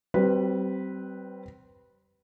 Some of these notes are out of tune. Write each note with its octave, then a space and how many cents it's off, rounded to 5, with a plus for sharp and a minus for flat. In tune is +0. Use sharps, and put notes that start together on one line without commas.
G3 -30 C4 +0 B4 -10